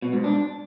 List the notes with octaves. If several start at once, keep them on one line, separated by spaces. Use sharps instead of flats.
B2
G#2
D4